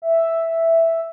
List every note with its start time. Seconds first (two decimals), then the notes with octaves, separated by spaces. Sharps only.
0.02 E5